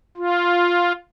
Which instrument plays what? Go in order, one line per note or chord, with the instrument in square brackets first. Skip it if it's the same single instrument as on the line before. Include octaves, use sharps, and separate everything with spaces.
[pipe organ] F4